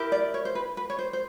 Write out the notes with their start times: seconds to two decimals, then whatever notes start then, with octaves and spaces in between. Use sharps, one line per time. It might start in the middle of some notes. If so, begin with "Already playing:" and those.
Already playing: E4 G4 A#4
0.12 D5
0.34 C#5
0.45 C5
0.55 B4
0.77 B4
0.90 C#5
0.99 C5
1.13 C5